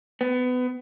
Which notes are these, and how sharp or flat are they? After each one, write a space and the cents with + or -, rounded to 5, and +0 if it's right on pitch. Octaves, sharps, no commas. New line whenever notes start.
B3 +25